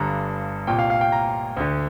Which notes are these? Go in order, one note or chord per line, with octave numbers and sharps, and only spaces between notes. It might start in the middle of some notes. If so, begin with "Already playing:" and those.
Already playing: G1 G2 D3 A#5
C2 A#2 G5
F5
F5
G5
A#5
D2 D3